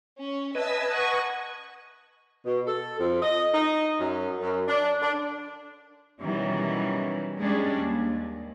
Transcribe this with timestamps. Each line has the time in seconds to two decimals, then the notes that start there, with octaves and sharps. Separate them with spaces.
0.19 C#4
0.55 B4 D#5 E5 G#5 A5 E6
0.92 F#5 C#6
2.44 B2
2.66 A4
2.98 F2
3.21 D#5
3.53 D#4
3.98 F#2
4.40 F#2
4.68 D4
5.02 D4
6.22 B2 D#3 E3 F#3 G3 C#4
7.39 G3 G#3 C#4 D4 G#4
7.76 D#2